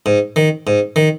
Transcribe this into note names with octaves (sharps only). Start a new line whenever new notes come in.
G#2
D#3
G#2
D#3